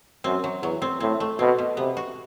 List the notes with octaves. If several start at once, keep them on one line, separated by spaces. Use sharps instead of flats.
F#2 C4
F#3
E2 F#3
C4
A2 C4
A3
B2 C4
B2
C3 B3
F#4